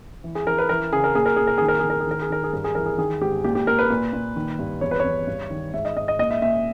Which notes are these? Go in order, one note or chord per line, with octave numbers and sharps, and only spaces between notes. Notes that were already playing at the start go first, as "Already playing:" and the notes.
E3
G#4
E3 A#4
B4
E3 A#4
C#3 G#4
A#4
A#2 G#4
A#4
A#2 G#4
A#4
D#3 G#4
A#4
D#3 G#4
A#4
G#4
D#3 A#4
G#4
D#3 A#4
G#4
G2 A#4
G#4
E3 A#4
G#4
D#3 G#4
G#2 G4
A#2 G4
G4
A#2 A#4
B4
A#2
A#2
D#3
G2
E2 C#5
B4
E2 C#5
G2
D#3
G#2 E5
D#5
G#2 D#5
D#5
A#2 D#5
E5
A#2 E5